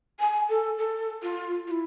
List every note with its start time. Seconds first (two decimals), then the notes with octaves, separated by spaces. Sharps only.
0.20 G#5
0.49 A4
0.78 A4
1.23 F4
1.67 F4
1.71 E4